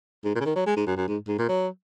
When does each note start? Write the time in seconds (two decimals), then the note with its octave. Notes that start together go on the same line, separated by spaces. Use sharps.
0.24 G#2
0.35 A#2
0.40 C#3
0.45 D#3
0.55 F#3
0.66 G#3
0.76 G#2
0.87 F#2
0.97 F#2
1.08 G#2
1.28 G#2
1.38 A#2
1.49 F#3